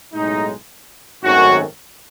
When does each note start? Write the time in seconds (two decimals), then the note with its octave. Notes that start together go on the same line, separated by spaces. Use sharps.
0.13 B1 A2 G#3 D#4
1.23 G#1 F#2 D#3 A3 C#4 F#4